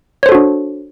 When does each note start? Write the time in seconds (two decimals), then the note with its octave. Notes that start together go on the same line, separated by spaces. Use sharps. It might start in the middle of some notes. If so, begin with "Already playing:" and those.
0.23 C#5
0.26 C5
0.29 A4
0.32 F#4
0.35 D4